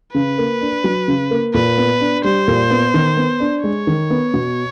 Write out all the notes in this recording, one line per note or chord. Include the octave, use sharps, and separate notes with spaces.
C#3 B4
A#3
D4
F#3
C#3
A#3
A#2 B4
B3
D4
G3 C5
A#2
B3
D#3
B3
D4
G#3 C#5
D#3
B3
B2